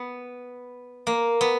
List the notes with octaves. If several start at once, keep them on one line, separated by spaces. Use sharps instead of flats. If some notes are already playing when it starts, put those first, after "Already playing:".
Already playing: B3
A#3
B3